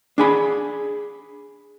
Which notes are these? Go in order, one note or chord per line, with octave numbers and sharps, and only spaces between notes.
D4 G#4 B5